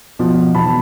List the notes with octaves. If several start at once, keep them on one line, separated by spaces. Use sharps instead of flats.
B2 F3
E1 A5 B5